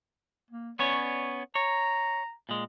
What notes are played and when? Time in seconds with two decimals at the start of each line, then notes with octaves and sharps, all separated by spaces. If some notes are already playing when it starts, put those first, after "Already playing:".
0.51 A#3
0.79 B3 C#4 C#5 D5
1.55 C#5 A#5
2.49 A#2 G#3